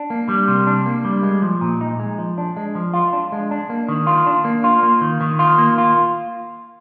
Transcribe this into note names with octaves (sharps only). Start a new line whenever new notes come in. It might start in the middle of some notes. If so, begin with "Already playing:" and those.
Already playing: D4
A#3
G3
C3
D4
A#3
G3
G#3
F3
A#2
D#4
G#3
F3
D4
G#3
F3
F4
D4
G#3
D4
A#3
D#3
F4
D4
A#3
F4
A#3
D#3
D#3
F4
A#3
F4